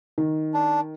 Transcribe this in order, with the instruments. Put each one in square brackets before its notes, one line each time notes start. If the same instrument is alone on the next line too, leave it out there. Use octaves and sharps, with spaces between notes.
[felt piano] D#3
[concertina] D4